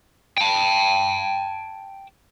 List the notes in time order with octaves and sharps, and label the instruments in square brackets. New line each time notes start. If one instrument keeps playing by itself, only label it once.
[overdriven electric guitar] G5 A5